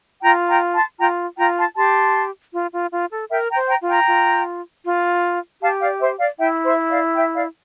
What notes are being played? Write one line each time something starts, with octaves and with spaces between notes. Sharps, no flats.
F4 G5 A#5
G5 A#5
A5 C6
F4 G5 A#5
F4 G5 A#5
A5 C6
G4 A5 C6
F4
F4
F4
A4
A#4 E5 G5
G5 A#5
C5
G5 A#5
F4
G5 A#5
F4
F4
G4 F5 A5
D5 F5
C5 E5
D5 F5
E4 E5 G5
C5 E5
D5 F5
E5 G5
D5 F5